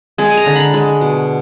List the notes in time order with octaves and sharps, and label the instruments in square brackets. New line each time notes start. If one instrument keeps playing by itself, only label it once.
[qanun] G#3 G#5
A#5
D3
B5
G#3
B2